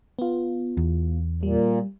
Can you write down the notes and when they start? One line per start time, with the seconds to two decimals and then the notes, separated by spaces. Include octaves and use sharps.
0.19 B3 F4
0.77 E2
1.43 A#2 G3